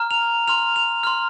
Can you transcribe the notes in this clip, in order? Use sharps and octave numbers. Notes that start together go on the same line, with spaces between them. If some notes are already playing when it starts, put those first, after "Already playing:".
Already playing: A#5 F6
F7
C6 F6 F7
F7
C6 F6